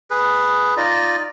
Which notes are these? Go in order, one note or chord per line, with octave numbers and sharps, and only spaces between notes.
G#4 B4
D#4 F4 D5 D#5